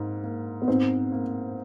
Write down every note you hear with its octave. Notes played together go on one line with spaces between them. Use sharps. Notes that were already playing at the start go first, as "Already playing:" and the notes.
Already playing: G#2 A#3
A#3
B3
G#2 C4
A#3